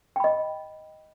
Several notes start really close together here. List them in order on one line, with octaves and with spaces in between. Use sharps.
G5 B5 D#5